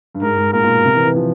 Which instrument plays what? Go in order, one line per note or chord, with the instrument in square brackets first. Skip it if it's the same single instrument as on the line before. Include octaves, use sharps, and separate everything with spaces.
[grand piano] G2
[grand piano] G#2 [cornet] A#4
[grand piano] G#2
[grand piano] A#2 [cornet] A#4
[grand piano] A#2
B2
C3
E3
E3
F3